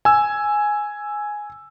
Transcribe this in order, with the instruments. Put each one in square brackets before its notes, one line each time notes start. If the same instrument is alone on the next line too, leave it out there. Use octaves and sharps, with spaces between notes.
[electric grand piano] G#5 E6